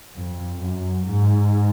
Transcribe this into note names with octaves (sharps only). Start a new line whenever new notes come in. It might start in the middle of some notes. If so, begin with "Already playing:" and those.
F2
F#2
G#2